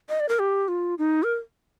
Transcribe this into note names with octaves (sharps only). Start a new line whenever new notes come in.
D#5
D5
A#4
G4
F4
D#4
A#4